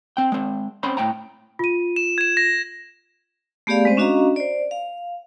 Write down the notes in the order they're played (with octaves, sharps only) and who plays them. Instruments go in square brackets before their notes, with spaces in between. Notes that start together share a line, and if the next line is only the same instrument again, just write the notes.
[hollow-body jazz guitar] C4 G5
G#3 C4
C4 C#4 C5 B5 C6
A2 G5 A#5
[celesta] F4 D#7
[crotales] E7
G#6 E7
A#6
[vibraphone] A3 B3 G4 G#4 D5 F5
G#3 C4 C5
C#4 D4 F#4 D#5 F5 A#5
C5 D5
F5